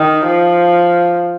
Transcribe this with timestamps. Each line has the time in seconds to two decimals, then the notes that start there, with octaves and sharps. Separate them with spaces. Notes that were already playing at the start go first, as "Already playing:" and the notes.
Already playing: D#3
0.26 F3